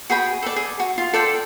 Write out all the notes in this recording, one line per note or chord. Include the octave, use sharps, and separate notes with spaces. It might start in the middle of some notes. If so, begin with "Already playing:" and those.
F#4 G#4 G5 B5
A4 D5
G#4
F#4
F4
A4 D5 G5 C6